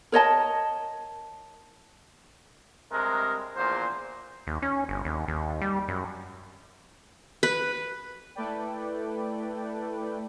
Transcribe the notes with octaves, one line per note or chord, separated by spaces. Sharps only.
A#4 C#5 D#5 A5
G2 C3 G#3 A#4
A#1 E2 A#2 C5
D#2
C#4
G1
D#2
D#2
G3
F#2
B4
A3 E4 A4 B4 D5 G5